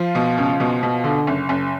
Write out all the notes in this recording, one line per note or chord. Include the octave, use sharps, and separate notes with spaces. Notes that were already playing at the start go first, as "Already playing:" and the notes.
Already playing: F3 F4
B2
C#2
B2
B2
D3
F#1
F#1